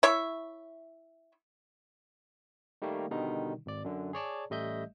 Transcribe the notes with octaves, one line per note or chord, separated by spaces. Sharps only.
E4 C#5 E5
D#3 G3 A3 A#3
B2 D3 D#3 G3 D#4
G#1 D5
F#2 D3
G#4 C#5 D5 A5
A1 G3 A3 D#5 E5 G6